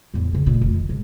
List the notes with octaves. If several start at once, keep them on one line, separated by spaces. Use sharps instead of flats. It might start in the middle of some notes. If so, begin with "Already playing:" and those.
E2 A2
C#3 C#4
A#2 A3
F1
D#3
G#2 C3